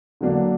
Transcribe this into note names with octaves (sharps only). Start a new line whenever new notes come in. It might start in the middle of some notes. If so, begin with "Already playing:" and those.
D3 F#3 A#3 D4